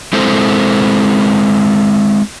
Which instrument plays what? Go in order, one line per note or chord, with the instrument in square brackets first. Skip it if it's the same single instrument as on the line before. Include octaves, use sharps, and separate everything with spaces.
[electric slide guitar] G#3 C4 E4 A4 C5